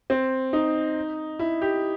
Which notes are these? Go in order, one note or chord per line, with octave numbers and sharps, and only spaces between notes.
C4
D#4
E4
G4